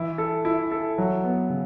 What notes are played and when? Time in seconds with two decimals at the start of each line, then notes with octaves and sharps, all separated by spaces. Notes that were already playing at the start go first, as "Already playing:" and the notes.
Already playing: E3 E4
0.18 A4
0.45 E4
0.72 A4
0.98 F#3
1.24 B3
1.50 C#3